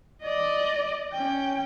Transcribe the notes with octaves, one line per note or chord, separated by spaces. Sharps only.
D5 D#5
C#4 G5